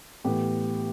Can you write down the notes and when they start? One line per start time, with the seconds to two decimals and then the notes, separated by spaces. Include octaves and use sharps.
0.24 A2 E3 B3 G4